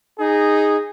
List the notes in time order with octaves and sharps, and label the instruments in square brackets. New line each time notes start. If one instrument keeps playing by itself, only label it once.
[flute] D#4 [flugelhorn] G#4